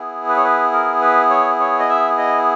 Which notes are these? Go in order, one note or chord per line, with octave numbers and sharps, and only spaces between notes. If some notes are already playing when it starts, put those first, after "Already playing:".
Already playing: B3 E4 G#4
B4
C#5
B4
A#4
B4
C#5
C#5
D#5
E5
D#5